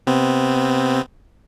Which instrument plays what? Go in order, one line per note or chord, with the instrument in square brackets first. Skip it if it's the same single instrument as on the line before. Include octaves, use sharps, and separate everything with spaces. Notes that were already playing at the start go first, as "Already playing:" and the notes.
[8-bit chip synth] C3 B3 C4